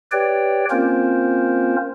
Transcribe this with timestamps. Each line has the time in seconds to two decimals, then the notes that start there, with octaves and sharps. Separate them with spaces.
0.12 G4 B4 C#5 D5 G5
0.71 A#3 C4 C#4 F4 A#4 C5